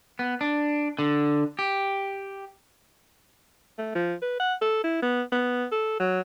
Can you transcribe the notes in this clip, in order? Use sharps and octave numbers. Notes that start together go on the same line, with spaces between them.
B3
D4
D3
G4
A3
F3
B4
F#5
A4
E4
B3
B3
A4
F#3